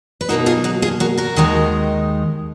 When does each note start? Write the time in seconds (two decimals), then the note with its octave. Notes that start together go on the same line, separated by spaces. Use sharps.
0.21 B4
0.29 B2 F#3 A#3 D#4 F#4 A#4
0.46 F4 G#4
0.64 D#4 F#4
0.82 F4 G#4
1.00 F#4 A#4
1.18 F#4 A#4
1.36 D#2 D#3 G#3 D#4